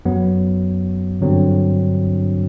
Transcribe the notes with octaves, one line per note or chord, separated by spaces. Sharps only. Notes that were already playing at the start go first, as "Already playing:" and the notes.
F#2 F#3 B3
G2 D3 F#3 C4